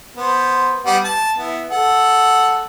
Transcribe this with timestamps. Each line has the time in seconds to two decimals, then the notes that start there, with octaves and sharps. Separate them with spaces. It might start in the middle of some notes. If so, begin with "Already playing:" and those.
0.17 B3 C5
0.86 G3 B3 F#5
1.04 A5
1.37 B3 E4
1.70 A4 F#5